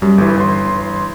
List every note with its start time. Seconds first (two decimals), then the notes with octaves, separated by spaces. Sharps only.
0.02 F#2 G3
0.18 G1 E3
0.37 G1 E3 C6